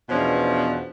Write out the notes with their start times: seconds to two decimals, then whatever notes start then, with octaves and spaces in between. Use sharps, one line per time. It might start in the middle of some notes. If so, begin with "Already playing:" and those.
0.10 E2 B2 F3 C#4 D4